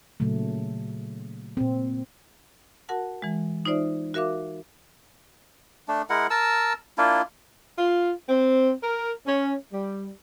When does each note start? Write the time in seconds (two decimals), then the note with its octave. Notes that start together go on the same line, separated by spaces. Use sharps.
0.20 A#2 C#3 F#3 A3
1.57 A#2 C4
2.89 F#4 A#4 F#5 A5
3.22 E3 G#3
3.65 D#4 F4 C5 D5 E5
4.14 F#4 A#4 E5 F5 D6
5.88 A3 D4
6.10 G#3 E4 A#4 F#5
6.30 A#4 A5 E6
6.98 A#3 D4 E4 F4
7.78 F4
8.29 C4
8.83 A#4
9.26 C#4
9.72 G3